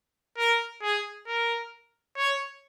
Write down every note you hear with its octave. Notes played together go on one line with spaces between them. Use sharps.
A#4
G#4
A#4
C#5